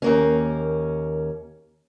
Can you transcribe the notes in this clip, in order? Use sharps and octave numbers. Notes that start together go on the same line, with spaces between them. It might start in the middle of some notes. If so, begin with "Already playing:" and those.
D#2 A#3 C#4